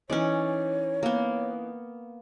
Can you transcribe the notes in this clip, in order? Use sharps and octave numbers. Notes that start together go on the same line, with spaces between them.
E3 C#4 D#4 C#5 D5
A#3 B3